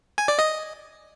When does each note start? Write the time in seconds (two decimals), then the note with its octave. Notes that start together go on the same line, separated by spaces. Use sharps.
0.18 G#5
0.28 D5
0.39 D#5